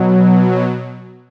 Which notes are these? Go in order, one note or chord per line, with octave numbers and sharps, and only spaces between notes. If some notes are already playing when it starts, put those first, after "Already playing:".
Already playing: B2 F#3